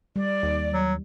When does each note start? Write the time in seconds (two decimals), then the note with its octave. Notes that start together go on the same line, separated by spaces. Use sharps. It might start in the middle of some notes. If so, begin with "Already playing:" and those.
0.16 G3 D5
0.43 D#2
0.73 F#3